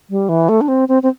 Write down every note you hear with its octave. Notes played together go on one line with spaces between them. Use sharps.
G3
E3
A3
D4
C4
C4
C4